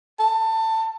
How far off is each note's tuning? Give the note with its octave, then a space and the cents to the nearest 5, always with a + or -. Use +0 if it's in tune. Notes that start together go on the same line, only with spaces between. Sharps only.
A5 +20